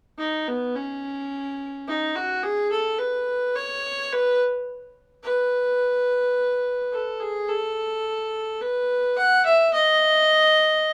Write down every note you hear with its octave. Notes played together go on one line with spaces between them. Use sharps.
D#4
B3
C#4
D#4
F#4
G#4
A4
B4
C#5
B4
B4
A4
G#4
A4
B4
F#5
E5
D#5